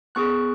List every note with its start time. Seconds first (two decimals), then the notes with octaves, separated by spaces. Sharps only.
0.15 B3 G#4 C#6 F#6